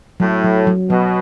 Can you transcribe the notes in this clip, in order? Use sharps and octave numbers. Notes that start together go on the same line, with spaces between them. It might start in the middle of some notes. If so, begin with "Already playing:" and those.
A2 F#3
F#3
F#3
B2 F#3